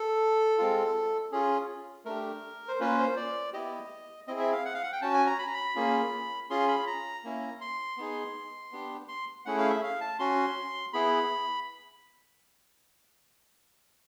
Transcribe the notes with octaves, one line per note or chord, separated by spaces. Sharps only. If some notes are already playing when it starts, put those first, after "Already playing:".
Already playing: A4
G#3 C4 F4
C#4 F4 G#4
A3 D4 G4 A#4
C5
A#3 C#4 F4 B4
C5
D5
B3 E4 G4 D#5
C4 E4 G#4 D#5
E5
F5
F#5
F5
F#5
G5
C#4 F#4 A5
G#5
A#5
B5
A#5
B5
A#3 C#4 F4 G#4
C#4 F4 G#4 C6
B5
A#5
A#3 C#4 E4
C6
B3 D#4 G#4
B3 D4 G4
C6
A3 C#4 E4 G#4 F#5
F5
E5
F5
A5
C#4 F#4 C6
B3 E4 G#4 B5